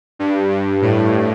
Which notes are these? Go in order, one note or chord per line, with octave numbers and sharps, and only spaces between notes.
G2
G2
A2